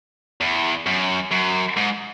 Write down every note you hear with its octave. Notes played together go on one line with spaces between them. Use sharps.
E2
F#2
F#2
G#2